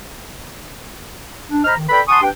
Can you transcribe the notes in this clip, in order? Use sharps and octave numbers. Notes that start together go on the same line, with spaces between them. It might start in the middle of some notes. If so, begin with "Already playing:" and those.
D4
C5 D#5 A#5 B5 F6
D#3
A4 B4 D5 G5 B5
F#5 G#5 A5 C6 C#6 D#6
D4 G4 B4 G5